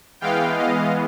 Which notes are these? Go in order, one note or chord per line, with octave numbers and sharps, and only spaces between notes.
E3 G#3 B3 F5 G5
D#5 F5